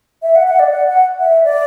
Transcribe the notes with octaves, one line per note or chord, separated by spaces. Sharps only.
E5
F#5
F#5
D5
F#5
F#5
E5
D5